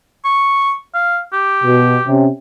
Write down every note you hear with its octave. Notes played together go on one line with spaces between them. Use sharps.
C#6
F5
G4
B2
C3 C#4